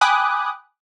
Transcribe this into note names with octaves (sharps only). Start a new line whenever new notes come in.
G5 G#5 B5 D6 D#6 F#6